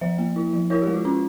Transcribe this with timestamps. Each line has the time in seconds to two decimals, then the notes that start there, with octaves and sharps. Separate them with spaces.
0.01 F3 C5 E5
0.18 A#3
0.36 E4
0.53 F3
0.70 E4 A#4 C#5
0.82 G4
0.87 G#3
0.93 F4
1.04 C#4 F4